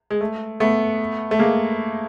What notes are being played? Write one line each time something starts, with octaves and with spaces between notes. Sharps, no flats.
G#3
A3
A3 B3
A3
G#3 A#3